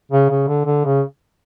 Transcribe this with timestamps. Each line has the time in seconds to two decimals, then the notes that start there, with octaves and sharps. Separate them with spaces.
0.11 C#3
0.30 C#3
0.48 D3
0.65 D3
0.85 C#3